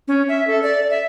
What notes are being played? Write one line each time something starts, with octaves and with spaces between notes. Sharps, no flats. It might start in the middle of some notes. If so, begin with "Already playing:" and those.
C#4
E5
A4
D5
E5